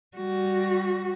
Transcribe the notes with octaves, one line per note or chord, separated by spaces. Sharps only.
G3 F#4